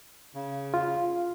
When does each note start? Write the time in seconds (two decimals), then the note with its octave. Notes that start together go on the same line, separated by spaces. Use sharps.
0.34 C#3
0.74 F4